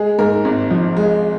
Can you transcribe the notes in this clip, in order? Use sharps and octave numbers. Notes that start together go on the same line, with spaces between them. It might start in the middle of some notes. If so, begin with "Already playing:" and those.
Already playing: G#3 G#4
G#2 A#4
G#1
F3
G#3